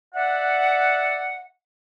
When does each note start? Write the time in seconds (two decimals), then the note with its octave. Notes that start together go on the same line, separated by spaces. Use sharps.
0.14 D5 E5 F#5